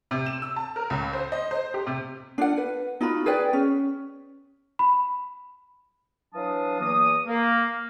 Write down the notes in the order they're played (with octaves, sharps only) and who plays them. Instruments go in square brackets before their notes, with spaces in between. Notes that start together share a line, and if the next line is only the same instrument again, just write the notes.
[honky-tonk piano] C3
E7
E6
A5
A#4
C#2
C5
D#5
C5
G4
C3
[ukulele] D4 F4 F#5
B4
D#4 F4 F#4 B5
G#4 B4 D5 G5
C#4
[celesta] B5
[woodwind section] E3 F#3 D4 F5 A5 D#6
E2 E3 A#3 D#6
A#3